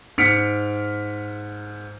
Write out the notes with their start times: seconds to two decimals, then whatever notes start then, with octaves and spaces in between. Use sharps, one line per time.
0.18 G#2 F6 B6 C#7 D7